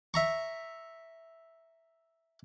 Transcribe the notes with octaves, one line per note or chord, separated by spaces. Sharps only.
E5 A#5 C#6